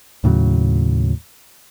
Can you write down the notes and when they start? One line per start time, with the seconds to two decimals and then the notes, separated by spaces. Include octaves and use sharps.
0.24 D#2 A2 C#3 F#3